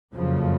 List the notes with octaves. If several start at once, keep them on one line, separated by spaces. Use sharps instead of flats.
F#1 F2 C#3 F3